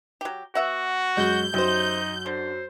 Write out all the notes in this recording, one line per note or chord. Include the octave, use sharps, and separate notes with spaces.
F#3 G4
B3 F#4 E5 F#5
F#2 G#3 G6
F#2 C3 D#4 C5
D3 C5